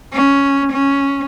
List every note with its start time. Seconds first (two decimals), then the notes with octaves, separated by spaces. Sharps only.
0.13 C#4
0.72 C#4